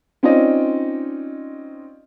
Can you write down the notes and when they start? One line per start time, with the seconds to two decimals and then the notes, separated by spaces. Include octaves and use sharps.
0.23 C4 C#4 D#4 F4 D5 D#5